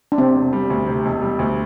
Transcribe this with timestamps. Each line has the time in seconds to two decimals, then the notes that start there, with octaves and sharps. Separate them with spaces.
0.12 D4
0.18 C3 C4
0.35 E1
0.53 G3
0.70 D2
0.87 C3
1.05 E1
1.22 G3
1.39 D2